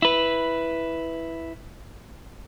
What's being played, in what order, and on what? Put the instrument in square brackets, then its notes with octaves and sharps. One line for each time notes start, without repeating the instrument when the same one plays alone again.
[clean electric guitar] E4 B4